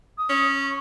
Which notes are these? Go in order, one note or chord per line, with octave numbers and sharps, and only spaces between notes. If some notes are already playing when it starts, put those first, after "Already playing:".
D#6
C#4
C#6